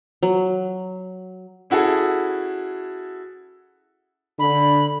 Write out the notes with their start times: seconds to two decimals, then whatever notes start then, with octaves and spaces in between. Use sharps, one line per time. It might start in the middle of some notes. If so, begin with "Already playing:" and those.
0.23 F#3
1.70 C#4 E4 F#4 G#4 A4
4.39 D3 D4 B5